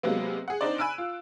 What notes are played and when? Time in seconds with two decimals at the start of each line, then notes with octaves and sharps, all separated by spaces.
0.03 C3 F#3 G#3 A#3 B3
0.48 G#4 F#5
0.61 C4 D4 D#4 C5 D5
0.78 G#5 B5 E6 F#6 D7
0.98 F4